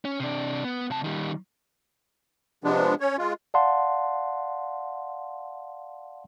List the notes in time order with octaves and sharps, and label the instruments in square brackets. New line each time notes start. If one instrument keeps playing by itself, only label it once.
[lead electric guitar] C#4
C3 D4
B3
C3 A5
D#3 G3
[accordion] C3 F3 G#3 B3 D4
C#4 C#5
G#3 F4
[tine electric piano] D5 F5 F#5 A5 C6